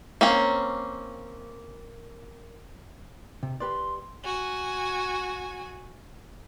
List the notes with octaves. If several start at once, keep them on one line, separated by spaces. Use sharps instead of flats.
A#3 C4 C#4
C3
G4 B4 D5 C6
F#4 G#5